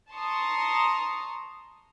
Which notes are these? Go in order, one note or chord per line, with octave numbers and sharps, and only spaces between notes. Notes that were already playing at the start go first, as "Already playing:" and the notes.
A5 A#5 C6 C#6 D#6